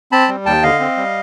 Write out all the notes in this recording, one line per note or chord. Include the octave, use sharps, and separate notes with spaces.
C4 A5 B5
G3
D#2 G5 A5
D3 D#5 F5
C4
G3